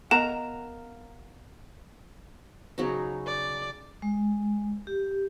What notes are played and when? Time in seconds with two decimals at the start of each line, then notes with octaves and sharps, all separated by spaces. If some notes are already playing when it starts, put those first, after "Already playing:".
0.11 B3 A#4 D#5 F5 F#5 A#5 E7
2.78 C#3 F#3 D#4
3.27 D5
4.02 G#3
4.87 G4